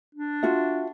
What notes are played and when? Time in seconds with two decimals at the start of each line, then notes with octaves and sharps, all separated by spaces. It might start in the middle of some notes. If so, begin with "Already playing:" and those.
0.15 D4
0.43 F4 F#4 E5